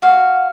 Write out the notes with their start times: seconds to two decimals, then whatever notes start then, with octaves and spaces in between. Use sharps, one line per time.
0.02 F#4 F5